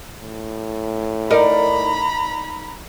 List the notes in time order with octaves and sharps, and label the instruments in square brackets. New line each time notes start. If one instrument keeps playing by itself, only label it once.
[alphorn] A2
[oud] D#4 A#4 [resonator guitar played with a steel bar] D5 [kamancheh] A#5 B5